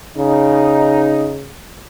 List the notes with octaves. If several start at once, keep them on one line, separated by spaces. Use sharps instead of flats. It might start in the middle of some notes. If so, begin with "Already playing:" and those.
C#3 D#4